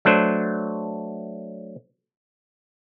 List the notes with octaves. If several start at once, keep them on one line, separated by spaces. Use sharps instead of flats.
F#3 A3 D4 C5